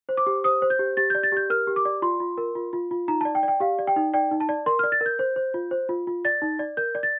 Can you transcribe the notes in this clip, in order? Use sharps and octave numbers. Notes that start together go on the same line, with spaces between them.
C5
D6
G4
C5 D#6
C5
G6
G4
G4 A6
G6
D5
A6
G4 G6
A#4 F6
G4
D6
D5
F4 C6
F4
A#4
F4
F4
F4
D#4 A#5
A5
D5
G5
D5
G5
G4 F5
D5
G5
D#4
D5 G5
D#4
A5
D5
A#4 C6
F6
D5
A6
A#4
G6
C5
C5
F4
C5
F4
F4
D5 A6
D#4
D5
A#4 G6
D5
A6